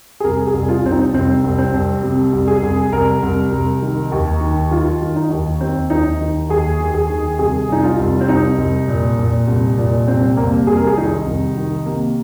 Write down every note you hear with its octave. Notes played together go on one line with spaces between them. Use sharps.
G#4
C2 A#4
G#4
C2
F4
C2 C4
D#4
C2 C4
C2
C4
C2
C3
C2
G#4
C2
C2 A#4
C2
C2
D#3
D#2
D#3
D#3 F4
D#3
D#4
D#2
D#2 C4
D#2 D#4
D#3
D#2 G#4
D#2
G#4
D#3
C2 G#4
C2 D#4
F4
C2
C4
C2 D#4
C2
A#2
A#2
C2
A#2
C2 C4
C2 A#3
C2 G#4
A#4
G#4
D#3 D#4
C2
D#3
C3 A#3